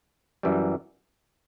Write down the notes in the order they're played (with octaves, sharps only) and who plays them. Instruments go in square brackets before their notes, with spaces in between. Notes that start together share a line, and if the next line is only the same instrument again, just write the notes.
[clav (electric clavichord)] F#2 E3 G3